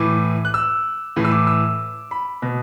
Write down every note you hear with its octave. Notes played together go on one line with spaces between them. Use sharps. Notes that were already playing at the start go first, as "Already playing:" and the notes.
Already playing: A2 E3 D6
F#6
E6
A2 E3
E6
D6
E6
B5
B2